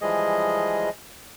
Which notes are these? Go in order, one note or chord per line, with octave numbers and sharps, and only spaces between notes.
E3 F3 G3 G#3 G#4 D#5